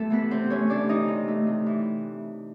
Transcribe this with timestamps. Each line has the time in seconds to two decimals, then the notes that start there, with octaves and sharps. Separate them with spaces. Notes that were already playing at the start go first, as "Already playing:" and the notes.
Already playing: C3 A3 A4
0.10 E3 B3 B4
0.31 C3 C4 C5
0.50 A3 C#4 C#5
0.70 C3 D4 D5
0.89 E3 D#4 D#5
1.08 C3
1.28 A3
1.47 C3
1.66 E3